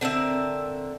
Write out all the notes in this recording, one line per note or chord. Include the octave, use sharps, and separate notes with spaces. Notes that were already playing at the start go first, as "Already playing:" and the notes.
D3 C4 A#4 E5